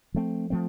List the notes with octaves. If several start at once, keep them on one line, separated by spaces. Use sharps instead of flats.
F3 A3 C4
F3 A3 C4